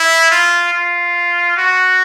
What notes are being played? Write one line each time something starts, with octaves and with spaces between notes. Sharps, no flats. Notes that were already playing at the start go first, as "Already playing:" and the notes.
Already playing: E4
F4
F4
F#4